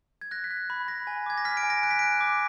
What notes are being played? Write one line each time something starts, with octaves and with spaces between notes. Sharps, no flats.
G#6
F#6 A#6
B6
F#6
B5
B5 A#6
G#5
D6 G#6
A#6
F6 B6
D7
G#5
A#6
F#6 D7
B6
F#6 D7
D6